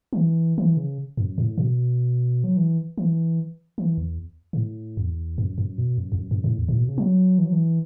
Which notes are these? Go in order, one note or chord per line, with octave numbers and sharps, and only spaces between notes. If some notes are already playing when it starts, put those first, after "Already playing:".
F#3
E3
E3
C#3
F#2
A2
B2
F#3
E3
E3
E3
E2
B2
A2
E2
F#2
F#2
B2
F#2
E2
F#2
F#2
A2
E2
A2
B2
C#3
F#3
E3
F#3
E3